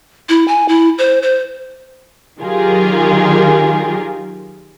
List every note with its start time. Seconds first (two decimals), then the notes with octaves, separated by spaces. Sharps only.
0.29 E4
0.48 G#5
0.68 E4
0.98 C5
1.23 C5
2.39 D#3 F#3 F4 G4 G#4 A#4